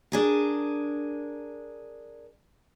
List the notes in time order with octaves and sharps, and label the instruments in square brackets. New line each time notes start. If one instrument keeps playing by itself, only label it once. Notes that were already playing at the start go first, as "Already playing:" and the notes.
[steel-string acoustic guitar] D4 G#4 A#4